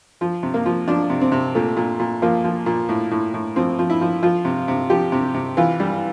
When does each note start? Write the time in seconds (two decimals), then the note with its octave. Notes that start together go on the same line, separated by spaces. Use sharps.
0.21 F3
0.43 C3
0.54 A#3
0.66 F3
0.88 F3 D4
1.10 C3
1.21 C4
1.32 C3
1.55 A#2 A3
1.76 A#2
1.99 A#2
2.22 F3 A#3
2.44 F3
2.66 A#2
2.89 A2
3.11 A2
3.34 A2
3.56 F3 C4
3.79 F3
3.90 E4
4.01 F3
4.22 F3 F4
4.45 C3
4.68 C3
4.90 F3 G4
5.12 C3
5.34 C3
5.57 E3 F4
5.80 G3